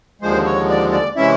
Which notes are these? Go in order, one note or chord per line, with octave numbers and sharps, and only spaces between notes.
D#2 D3 F3 G#3 C5
C#5
D5
D5
C3 E3 G#3 C#4 E4 E5